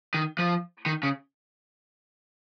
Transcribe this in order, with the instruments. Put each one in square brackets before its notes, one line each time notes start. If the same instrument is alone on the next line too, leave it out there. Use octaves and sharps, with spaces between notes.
[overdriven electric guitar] D#3
F3
D#3
C#3